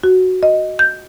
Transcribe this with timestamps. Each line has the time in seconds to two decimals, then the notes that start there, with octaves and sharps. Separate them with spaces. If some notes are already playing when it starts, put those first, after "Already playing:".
0.03 F#4
0.43 D#5
0.79 G6